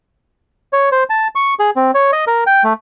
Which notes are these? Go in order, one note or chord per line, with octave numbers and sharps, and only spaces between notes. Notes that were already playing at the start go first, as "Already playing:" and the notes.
C#5
C5
A5
C#6
G#4
C4
C#5
D#5
A#4
G5
A3